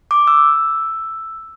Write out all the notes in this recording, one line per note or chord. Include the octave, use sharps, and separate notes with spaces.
D6
E6